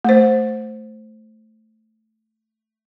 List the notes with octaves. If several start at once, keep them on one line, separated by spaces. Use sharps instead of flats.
A3 C5